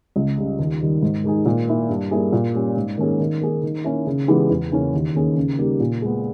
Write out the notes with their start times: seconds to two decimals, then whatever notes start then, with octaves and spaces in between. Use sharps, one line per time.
0.16 C#2
0.37 C#3 G3
0.59 D#2
0.81 D#3 G3
1.02 G#2
1.24 D#3 G#3 D#4 G#4
1.46 A#2
1.68 A#3 E4
1.89 G2
2.11 G3 A#3 E4 G#4
2.33 A#2
2.54 G3 C#4
2.77 G#2
2.98 D#3 A#3 C#4 G#4
3.20 D#3
3.41 A#3 D#4 G#4
3.63 D#3
3.84 A#3 C#4 E4
4.07 C#3
4.28 E3 G#3 B3 G4
4.50 E2
4.72 C#3 E3 A#3 C#4
4.93 D#2
5.15 D#3 A#3 C#4 G#4
5.37 C#3
5.58 G3 A#3 D#4 G4
5.80 A#2
6.02 G#3 B3